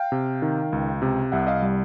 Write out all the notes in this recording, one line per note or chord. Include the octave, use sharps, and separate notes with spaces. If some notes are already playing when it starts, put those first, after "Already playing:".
Already playing: F5 G5
C3
D#3
C#2
C3
C2 E5 F#5
D#5 F5
G3